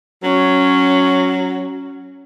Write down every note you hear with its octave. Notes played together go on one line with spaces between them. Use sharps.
F#3 C#4